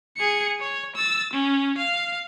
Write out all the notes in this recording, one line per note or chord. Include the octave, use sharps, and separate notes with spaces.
G#4 C#7
C#5
E6 A6
C#4
F5